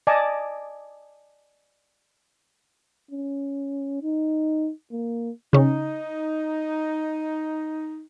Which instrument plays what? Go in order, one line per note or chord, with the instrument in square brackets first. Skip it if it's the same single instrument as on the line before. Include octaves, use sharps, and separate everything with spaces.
[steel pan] D5 D#5 G#5 A5 D6 D#6
[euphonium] C#4
D#4
A#3
[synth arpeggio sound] C#3 C#4 [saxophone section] D#4